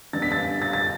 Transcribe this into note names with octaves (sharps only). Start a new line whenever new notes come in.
D3 G3 B3 D4 A6
B6
A6
A6
A6